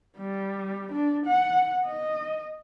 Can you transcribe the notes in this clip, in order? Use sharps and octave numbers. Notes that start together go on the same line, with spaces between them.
G3
D4
F#5
D#5